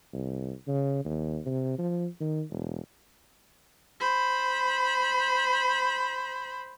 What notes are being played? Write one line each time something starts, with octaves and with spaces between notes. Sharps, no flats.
C2
C#3
D#2
C3
F3
D#3
E1
C5 B5